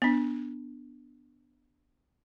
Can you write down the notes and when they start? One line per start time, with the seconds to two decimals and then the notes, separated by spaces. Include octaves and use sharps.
0.02 B3 D4